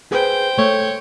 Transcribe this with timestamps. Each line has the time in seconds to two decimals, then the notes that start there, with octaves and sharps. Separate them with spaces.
0.12 G#4 B4 C5 G5
0.59 A3 C#5